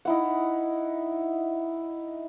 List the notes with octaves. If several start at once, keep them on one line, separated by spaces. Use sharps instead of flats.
D#4 E4 F#5